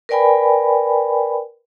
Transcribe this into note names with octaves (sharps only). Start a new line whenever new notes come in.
A#4 B4 D5 G5 G#5 B5